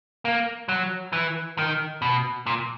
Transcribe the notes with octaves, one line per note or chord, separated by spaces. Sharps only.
A#3
F#3
E3
D#3
B2
A#2